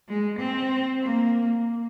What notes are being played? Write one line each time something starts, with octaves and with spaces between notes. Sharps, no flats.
G#3
C4
A#3